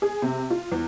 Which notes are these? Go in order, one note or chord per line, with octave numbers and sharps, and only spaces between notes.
G#4
C3
F4
E2